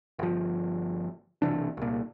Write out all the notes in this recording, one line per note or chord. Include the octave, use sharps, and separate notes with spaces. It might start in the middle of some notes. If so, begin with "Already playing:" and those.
G1 F3
B1 C3 E3 D4
C2 A#2